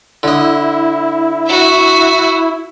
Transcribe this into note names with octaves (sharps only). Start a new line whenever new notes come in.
D3 E4 D#5
F#4 E5